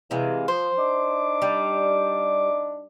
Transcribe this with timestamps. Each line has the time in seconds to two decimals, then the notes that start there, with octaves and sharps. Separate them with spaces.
0.11 C3 E3 G#3 F5
0.48 F3 C5
0.77 D4 D#4 D6
1.42 G3